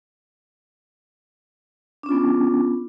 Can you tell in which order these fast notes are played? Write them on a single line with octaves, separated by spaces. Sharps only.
D4 C#4 F4 B3